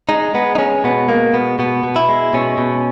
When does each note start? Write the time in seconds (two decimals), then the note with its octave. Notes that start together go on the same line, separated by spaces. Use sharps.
0.09 G#3 D#4
0.34 G#3 B3
0.55 D#4
0.59 G#3 C#4
0.84 B2 B3
1.08 G#3 A#3
1.33 B2 B3
1.59 B2 B3
1.83 B2
1.96 E4
2.09 G#3
2.34 B2 C#4
2.58 B2